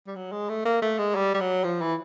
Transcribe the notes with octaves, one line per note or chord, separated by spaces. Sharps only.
G3
F#3
G#3
A3
A#3
A3
G#3
G3
G3
F#3
F3
E3